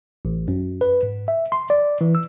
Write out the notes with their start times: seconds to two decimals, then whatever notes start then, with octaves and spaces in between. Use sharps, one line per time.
0.25 A1
0.48 F#2
0.81 B4
1.03 G#2
1.28 E5
1.52 C6
1.70 D5
2.01 E3
2.15 E6